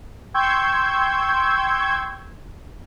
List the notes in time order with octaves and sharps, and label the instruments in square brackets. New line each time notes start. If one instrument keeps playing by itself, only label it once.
[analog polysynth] G5 C6 C#6 E6 G6 G#6